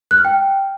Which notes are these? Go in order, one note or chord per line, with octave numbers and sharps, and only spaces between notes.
F#6
F6
G5